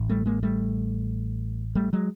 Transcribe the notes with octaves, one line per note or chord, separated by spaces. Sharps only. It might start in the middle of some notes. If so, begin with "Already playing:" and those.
Already playing: A1 A2
G3 A3
G#3 A#3
G3 A3
G3 A3
F#3 G#3